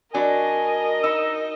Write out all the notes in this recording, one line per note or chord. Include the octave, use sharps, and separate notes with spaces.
F#3 D4 A#4 D#5 G#5
D#4 E6